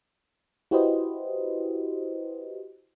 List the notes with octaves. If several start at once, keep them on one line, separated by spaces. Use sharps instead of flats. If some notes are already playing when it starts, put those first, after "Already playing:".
E4 F#4 G4 B4 C5 D#5